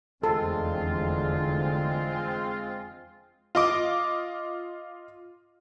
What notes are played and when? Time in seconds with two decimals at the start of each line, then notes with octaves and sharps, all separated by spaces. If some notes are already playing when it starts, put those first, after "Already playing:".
0.24 F1 E2 D3 G#3 C4 F4 A4
3.55 F4 D#5 D6